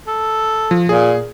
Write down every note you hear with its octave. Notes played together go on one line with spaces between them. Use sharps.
A4
F3
A#2 G#4